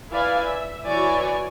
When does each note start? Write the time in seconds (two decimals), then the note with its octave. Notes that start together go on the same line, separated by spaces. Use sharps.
0.10 E4 B4 D5 F5 G#5
0.45 E5
0.86 E3 F#4 C#5 D5 G#5